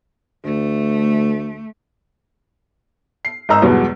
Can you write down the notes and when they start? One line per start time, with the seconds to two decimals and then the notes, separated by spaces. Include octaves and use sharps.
0.44 D2 A3
3.25 C7
3.49 G#1 G#2 D#4 A#5 E6
3.62 E2 G2 B2 F#3 G#3